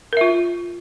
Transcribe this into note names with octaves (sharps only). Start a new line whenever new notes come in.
F4 A#4 E5